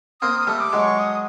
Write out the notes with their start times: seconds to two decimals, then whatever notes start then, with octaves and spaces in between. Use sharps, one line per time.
0.21 A#3 C4 D#6
0.41 D#6
0.47 G3 A3
0.60 D6
0.72 F#3 G#3
0.80 C#6
0.99 D#6